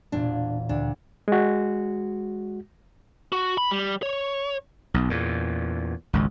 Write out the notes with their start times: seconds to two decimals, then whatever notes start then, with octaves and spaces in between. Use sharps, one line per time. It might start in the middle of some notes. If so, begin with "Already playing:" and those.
0.12 E1 A#2 D4
0.69 D2 D4
1.28 G#3 F#4
3.32 F#4
3.58 B5
3.71 G3
4.03 C#5
4.94 B1
5.10 E2 A#2
6.13 G#1 C#2